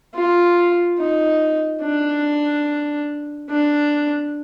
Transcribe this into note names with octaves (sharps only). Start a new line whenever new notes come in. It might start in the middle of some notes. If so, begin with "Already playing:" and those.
F4
D#4
D4
D4